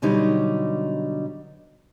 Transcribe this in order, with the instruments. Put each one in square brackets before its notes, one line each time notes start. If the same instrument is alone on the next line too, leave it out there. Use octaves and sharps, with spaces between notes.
[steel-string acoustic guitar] B2 D3 F#3 G3 D#4